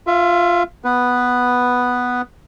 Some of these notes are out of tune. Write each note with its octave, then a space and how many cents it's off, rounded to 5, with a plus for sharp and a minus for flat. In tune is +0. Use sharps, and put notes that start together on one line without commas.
F4 +0 E5 +25
B3 +0 B4 +0